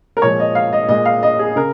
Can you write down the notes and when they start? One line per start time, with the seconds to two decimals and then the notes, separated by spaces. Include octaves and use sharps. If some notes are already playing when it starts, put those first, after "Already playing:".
0.17 A#4
0.22 A#2 F3 G#3 C#5
0.40 D#5
0.55 F5
0.73 D#5
0.89 A#2 G#3 D#5
1.05 F5
1.23 D#5
1.39 G#4
1.56 C#3 A#4